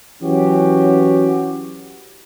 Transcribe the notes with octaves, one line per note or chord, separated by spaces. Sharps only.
E3 F#3 C#4 F#4 G4